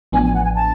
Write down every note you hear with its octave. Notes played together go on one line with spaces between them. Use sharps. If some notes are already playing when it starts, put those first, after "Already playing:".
A1 A2 F3 B3 D4 G#5
G#5
F#5
G#5
A5